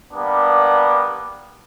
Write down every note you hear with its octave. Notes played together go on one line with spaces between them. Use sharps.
G3 A#3 B3 D4